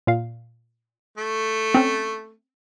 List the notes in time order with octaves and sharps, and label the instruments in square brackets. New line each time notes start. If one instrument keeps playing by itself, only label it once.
[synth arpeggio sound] A#2 F5
[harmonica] A3
[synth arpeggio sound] C4 C#4